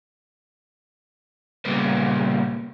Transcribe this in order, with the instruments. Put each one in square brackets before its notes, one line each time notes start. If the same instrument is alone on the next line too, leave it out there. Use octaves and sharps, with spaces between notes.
[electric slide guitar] A#2 C#3 G3 A#3 B3